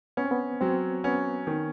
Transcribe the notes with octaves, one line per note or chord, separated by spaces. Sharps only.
B3 C#4
C4
B3
F#3 C4
B3 C#4
D#3